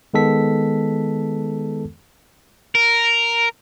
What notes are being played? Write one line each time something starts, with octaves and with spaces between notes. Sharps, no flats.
D#3 G#3 B3 A4 B6
A#4